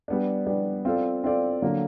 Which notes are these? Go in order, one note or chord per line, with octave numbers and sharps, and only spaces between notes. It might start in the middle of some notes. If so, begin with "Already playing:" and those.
G3 B3 D4
G3 B3 D4
C4 F4 A4 D5
C4 F4 A4 D5
D3 F#3 A#3